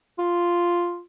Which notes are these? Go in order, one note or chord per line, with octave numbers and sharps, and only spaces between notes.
F4